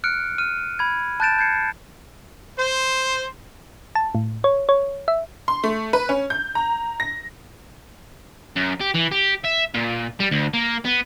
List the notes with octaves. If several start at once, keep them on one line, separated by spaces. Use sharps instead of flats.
F6 F#6 C#7 D7
F6 D#7
B5 G#6
A5 F#6 G6 A6 D7 E7
G6 G#6 C7 C#7
C5
A5
A2
C#5
C#5
E5
C6
A3
B4
C#4
G6
A#5
A#6
F#2
G4
E3
G4
E5
A#2
G3
D2
A#3
B3